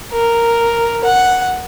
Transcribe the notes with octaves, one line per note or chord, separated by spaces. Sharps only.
A#4
F#5